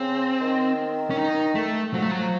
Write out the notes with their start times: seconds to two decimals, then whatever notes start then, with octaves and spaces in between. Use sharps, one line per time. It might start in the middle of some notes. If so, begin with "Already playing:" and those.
Already playing: C#3 C4
0.41 D#3
1.10 C#4
1.17 D#4
1.55 A3
1.94 F3 F#3
2.02 A3
2.11 F#3